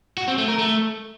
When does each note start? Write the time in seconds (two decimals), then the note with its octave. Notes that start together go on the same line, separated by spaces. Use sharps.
0.17 F#4
0.28 C4
0.38 A3
0.48 A#4
0.58 A3